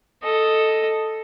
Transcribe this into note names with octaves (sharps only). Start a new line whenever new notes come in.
A4 D#5